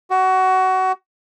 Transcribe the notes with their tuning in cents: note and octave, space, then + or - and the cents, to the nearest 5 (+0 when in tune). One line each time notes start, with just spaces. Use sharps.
F#4 +20